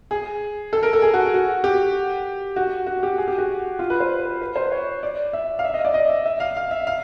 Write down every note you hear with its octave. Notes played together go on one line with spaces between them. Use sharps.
G#4
A4
A#4
A4
G#4
F#4
F#4
G4
F#4
F#4
G4
G#4
G4
F#4
F4
B4
C5
B4
B4
C5
C#5
D5
E5
F5
E5
D#5
D5
D#5
E5
E5
F5
F5
E5
F5